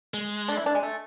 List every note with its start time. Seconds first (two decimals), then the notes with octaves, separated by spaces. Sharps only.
0.14 G#3
0.48 D4
0.57 E4
0.66 D4
0.75 G#3
0.83 A3